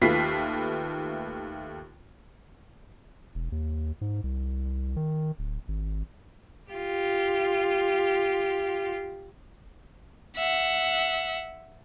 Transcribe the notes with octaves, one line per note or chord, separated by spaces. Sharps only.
D#2 A3 F4 B4 B6 C7
E1
D#2
G#2
C2
D#3
D1
G#1
F4 G4
E5 F#5